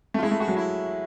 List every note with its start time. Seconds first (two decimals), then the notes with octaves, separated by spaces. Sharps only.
0.14 A3
0.18 F4
0.22 G#3 E4
0.31 A3
0.40 G#3 F#4
0.48 F#3
0.56 E4